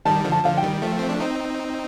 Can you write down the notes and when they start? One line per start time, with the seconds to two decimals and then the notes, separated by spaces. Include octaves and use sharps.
0.05 D#3 G3 A5
0.24 D3 F3
0.32 A5
0.44 D3 F3 F5
0.57 G5
0.63 D#3 G3
0.82 F3 A3
0.99 C4
1.09 D4
1.20 C4 D#4